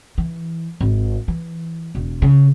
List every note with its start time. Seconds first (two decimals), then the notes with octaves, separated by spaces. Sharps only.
0.18 E3
0.81 G#1
1.28 E3
1.95 E1
2.22 C#3